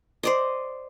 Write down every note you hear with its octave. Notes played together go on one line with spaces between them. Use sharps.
C5 D5 D#5